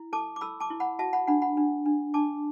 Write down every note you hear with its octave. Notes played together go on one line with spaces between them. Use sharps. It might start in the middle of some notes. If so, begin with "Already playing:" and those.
Already playing: E4
A4 A5 D6
D6
A4 B5 E6
A5 D6
E4
F#5 B5
F#4 E5 A5
F#5 B5
D4 F#5 B5
F#5 B5
D4
D4
D4 A5 D6